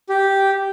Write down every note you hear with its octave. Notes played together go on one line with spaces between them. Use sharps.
G4